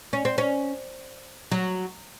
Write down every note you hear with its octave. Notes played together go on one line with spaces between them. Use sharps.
C#4
C4
C#4
F#3